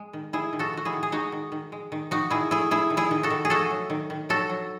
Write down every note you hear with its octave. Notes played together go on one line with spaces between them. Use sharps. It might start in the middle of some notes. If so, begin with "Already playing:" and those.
Already playing: G#3
D#3
D#3 E4 G#4
D#3
F#4 A4
D#3 F#4
E4 G#4
D#3
G#4
G#3 D#4 F#4
D#3
D#3
G#3
D#3
D#3 D#4 F#4
D#3 E4 G#4
A3 E4 G#4
A3 E4 G#4
D#3
E4 G#4
D#3
F#4 A4
D#3
G#4
A3 F#4 A4
F#3
D#3
D#3
F#3 F#4 A4
F#3